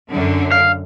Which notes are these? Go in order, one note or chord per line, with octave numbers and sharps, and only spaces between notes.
F#2 D3
F5